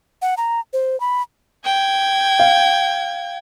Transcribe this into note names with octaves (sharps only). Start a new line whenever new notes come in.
F#5
A#5
C5
B5
G5 G#6
F5